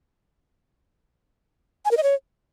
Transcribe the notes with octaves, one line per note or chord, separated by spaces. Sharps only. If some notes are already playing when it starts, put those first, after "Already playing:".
G#5
A#4
D#5
C#5